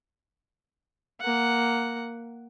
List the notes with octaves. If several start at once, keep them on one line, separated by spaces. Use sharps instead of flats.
A#3 F#5